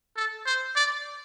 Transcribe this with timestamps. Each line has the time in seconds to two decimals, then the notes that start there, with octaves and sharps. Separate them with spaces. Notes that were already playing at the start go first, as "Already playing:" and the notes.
0.16 A4
0.46 C5
0.76 D5